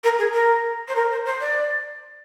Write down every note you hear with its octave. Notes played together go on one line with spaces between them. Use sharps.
A#4
G#4
A#4
C5
A#4
C5
C5
D5